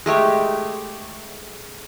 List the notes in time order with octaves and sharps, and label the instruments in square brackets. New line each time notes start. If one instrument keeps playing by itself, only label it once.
[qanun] G#3 A3 G4 C#5